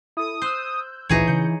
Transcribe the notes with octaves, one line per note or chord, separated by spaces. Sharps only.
E4 A4 D#6
C5 E6 F#6 G6
A1 D2 A#2 E3 D#4 G#4 C#5
C#3 G6 C#7